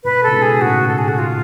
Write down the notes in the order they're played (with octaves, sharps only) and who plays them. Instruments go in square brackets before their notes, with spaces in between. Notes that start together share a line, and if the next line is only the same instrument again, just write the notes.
[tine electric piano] G#2 B2 [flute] B4
[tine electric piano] C#3 [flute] A4
[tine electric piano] G#2 B2
[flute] G#4
[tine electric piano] A2 C#3 [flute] F#4
[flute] A4
G#4
F#4
F4